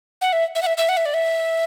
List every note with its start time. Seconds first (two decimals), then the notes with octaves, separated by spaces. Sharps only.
0.21 F#5
0.33 E5
0.55 E5
0.62 F#5
0.66 E5
0.77 E5
0.89 F#5
0.97 E5
1.05 D5
1.14 E5